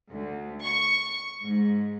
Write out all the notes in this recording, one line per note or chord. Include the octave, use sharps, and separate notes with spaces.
D2
C#6
G#2